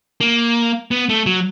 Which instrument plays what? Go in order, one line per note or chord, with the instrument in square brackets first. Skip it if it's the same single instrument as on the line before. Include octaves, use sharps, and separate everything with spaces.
[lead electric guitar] A#3
B3
A3
F#3